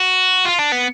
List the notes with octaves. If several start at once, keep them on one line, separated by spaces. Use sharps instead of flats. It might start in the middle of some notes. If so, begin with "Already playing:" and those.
Already playing: F#4
F4
D4
B3